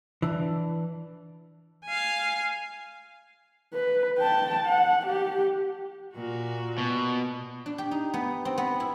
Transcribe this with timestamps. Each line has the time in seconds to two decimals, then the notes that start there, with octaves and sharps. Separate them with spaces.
0.22 E3 D4
1.85 F5 G#5
3.74 B4
4.19 G5 A5
4.66 F#5
5.06 G4
6.15 A#2 F#4
6.78 B2
7.66 D4
7.78 G4
7.91 D#4
8.14 B3
8.45 C4
8.58 B3
8.80 E4